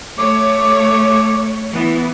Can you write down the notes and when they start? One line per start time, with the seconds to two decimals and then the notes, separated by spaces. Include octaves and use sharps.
0.18 A3 C#5 D6
1.72 E3 B3